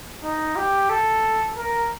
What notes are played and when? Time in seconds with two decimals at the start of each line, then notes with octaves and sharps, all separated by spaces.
0.23 D#4
0.56 G4
0.89 A4
1.57 A#4